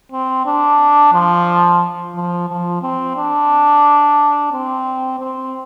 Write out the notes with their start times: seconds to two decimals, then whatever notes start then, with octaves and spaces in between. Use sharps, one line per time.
0.12 C4
0.46 D4
1.13 F3
2.15 F3
2.48 F3
2.82 C4
3.16 D4
4.52 C4
5.20 C4